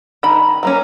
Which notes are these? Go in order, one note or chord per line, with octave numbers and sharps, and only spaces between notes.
D#3 B5
F#3 A#3 C#4